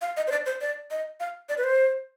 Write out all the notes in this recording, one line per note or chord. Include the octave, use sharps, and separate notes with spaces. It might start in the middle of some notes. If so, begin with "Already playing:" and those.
F5
D#5
C5
D5
C5
D5
D#5
F5
D5
B4
C5